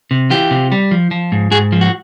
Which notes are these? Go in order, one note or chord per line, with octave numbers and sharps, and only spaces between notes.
C3
E3 F4 G4
C3
G3
F3
F3
G#2
G#2 F#4 G#4
F3
F#4